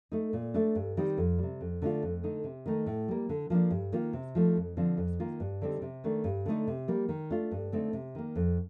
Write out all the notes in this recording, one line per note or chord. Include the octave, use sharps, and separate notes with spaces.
A3 D#4
A#2
A3 D4
G2
D#3 G3 C4 D#4
F2
C3 G3
F2
D3 A3 D4 F4
F2
D3 A3 D#4
C3
D#3 A3 D#4
A2
G3 A#3
D3
F3 A#3 D4
G2
D#3 A#3 F4
C3
F3 A3 D#4
F2
D3 F3 C4 F4
F2
D#3 A#3 F4
G2
D3 G3 C4 D#4
C3
D#3 A3 D4
G2
D3 A3 D#4
C3
G3 A#3
D#3
A3 D4 F4
G2
D3 A3 C4 D#4
C3
D#3 A#3
F2